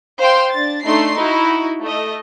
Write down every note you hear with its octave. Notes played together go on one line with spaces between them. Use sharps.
C5 F5 G5 C6
D4 A6
A3 D4 D#4 C6 C7
D#4 E4 F#4
A3 D#5